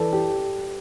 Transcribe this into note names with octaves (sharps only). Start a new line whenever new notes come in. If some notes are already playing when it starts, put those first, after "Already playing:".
Already playing: E3 A4 B4 D5
G4